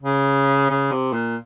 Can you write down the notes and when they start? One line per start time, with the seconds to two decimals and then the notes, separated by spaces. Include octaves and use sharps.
0.02 C#3
0.70 C#3
0.92 C3
1.13 A#2